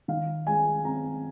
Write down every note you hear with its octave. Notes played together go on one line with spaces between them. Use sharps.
D#3 F5
G#3 G#5
C4 A#5